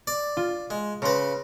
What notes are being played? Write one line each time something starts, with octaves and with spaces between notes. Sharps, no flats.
D5
F4
G#3
C#3 B4 A#5 C6 A#6